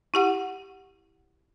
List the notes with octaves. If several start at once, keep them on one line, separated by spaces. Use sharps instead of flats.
E4 G4 F#5